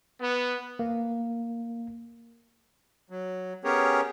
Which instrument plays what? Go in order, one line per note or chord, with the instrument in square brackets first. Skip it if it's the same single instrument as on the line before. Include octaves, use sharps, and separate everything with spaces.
[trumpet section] B3
[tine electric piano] A#3
[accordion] F#3
B3 C#4 G4 G#4 A#4 C#5